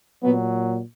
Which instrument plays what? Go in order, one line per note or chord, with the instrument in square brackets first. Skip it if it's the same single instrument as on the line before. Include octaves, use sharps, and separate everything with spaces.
[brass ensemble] A#2 F#3 B3